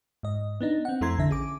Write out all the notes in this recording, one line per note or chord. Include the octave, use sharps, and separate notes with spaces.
G#2 D#5
B3 D4 D#4
C4 F#5
F2 A3 E4 A#5 C6 G#6
A1 D3 E5 A#6
C#4 G#4 D6